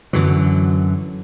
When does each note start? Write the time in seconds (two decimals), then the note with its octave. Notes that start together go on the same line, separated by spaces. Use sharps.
0.13 F#2 D3 E3 F#3